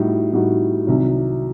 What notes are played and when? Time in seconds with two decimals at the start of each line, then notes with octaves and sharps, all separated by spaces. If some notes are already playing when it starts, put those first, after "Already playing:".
Already playing: A2 G3 D#4 F#4
0.33 A2 G3 D#4 F#4
0.87 C2 C3 D#3 F#3